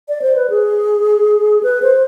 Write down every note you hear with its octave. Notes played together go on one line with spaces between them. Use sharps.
D5
C5
B4
G#4
B4
C5